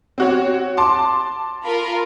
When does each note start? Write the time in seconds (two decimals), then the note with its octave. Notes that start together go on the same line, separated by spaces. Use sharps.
0.18 C4 F#4 C#5
0.77 A5 C6 D6
1.64 F4 A#4 B5